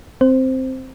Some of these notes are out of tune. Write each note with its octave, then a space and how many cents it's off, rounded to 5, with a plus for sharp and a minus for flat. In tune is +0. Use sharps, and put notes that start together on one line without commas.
C4 +0 C5 +0